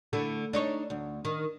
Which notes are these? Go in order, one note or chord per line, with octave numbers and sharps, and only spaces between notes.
D3 A3 E4
D4 D#4 C#5
D2
D#3